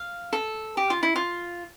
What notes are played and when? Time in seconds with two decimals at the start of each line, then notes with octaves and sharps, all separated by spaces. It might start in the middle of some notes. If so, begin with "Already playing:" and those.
Already playing: F5
0.33 A4
0.77 G4
0.90 F4
1.03 E4
1.16 F4